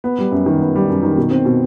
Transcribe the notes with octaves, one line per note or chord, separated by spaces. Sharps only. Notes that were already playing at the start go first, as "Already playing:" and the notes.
B3
G3
F#2
D#3
B3
G3
F#2
D#3
B2
C4
B2